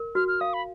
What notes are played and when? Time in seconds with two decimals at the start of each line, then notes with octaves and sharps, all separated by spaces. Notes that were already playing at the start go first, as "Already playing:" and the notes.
Already playing: A#4
0.15 F#4 F6
0.28 F6
0.41 F5 D#6
0.54 B5